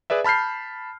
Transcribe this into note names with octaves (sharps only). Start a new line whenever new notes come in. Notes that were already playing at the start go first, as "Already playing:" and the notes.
G#4 B4 D5 E5
A5 B5 F6 G6 C7